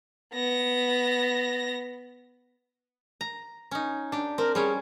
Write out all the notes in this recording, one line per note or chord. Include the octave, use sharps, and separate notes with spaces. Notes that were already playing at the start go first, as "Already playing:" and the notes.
B3 A#6
A#5
C#4 D#4
D4 G4
C4 A#4
G3 C#4 G#4 C#5